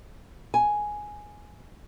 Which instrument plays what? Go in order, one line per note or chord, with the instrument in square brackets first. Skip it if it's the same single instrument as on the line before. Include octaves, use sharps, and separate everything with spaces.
[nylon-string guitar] G#5